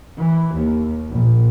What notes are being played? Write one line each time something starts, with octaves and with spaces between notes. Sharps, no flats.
E3
D#2
A#1